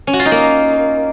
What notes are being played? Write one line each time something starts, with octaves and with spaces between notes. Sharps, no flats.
C#4
F#4
F4
D#4
A#3